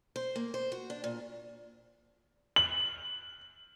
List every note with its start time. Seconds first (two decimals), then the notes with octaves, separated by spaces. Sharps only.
0.16 C5
0.36 A#3
0.54 C5
0.72 F#4
0.90 D4
1.04 A#2
2.56 F#7